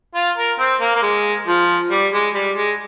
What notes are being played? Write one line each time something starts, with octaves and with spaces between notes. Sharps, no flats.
F4
A#4
C4
A#3
A#3
G#3
F3
G3
G#3
G3
G#3